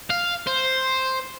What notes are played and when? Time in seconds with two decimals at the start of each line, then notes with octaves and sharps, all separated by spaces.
0.10 F5
0.47 C5